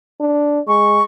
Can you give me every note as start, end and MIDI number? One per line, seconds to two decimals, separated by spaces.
0.20 0.60 62
0.68 1.02 56
0.68 1.03 85